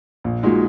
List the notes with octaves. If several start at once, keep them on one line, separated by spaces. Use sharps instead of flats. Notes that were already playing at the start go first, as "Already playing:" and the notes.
A#1
A#2 G#3 D#4 F#4